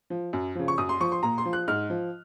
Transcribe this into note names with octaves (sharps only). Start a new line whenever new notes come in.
F3
F#2
C#3 F3
C#6
F#2 D#6
C6
F3 C#6
C6
A#2 A#5
C6
F3
F#6
G#2 F6
F3